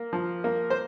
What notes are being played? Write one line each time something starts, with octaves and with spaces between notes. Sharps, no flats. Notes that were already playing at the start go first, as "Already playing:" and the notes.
Already playing: A#3
F3
A#3
C5